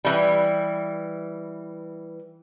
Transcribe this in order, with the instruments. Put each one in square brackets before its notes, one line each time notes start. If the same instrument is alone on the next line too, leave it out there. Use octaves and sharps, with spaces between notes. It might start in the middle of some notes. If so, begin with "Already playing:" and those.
[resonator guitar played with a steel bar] E3 G3